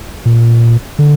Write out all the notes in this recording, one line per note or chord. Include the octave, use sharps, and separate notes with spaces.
A#2
D3